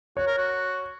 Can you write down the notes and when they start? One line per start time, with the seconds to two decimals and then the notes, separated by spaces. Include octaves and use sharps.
0.17 F#4 C#5
0.27 A#4
0.38 F#4